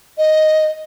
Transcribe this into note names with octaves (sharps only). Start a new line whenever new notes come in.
D#5